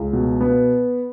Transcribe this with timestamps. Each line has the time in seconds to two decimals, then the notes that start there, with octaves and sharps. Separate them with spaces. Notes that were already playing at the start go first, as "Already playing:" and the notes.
Already playing: C#2
0.13 B2
0.41 B3